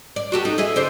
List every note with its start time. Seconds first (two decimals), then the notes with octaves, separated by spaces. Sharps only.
0.16 D5
0.32 F#4 G4 A4
0.45 D#4
0.58 E4 G#4 D#5
0.76 D3 C5 D5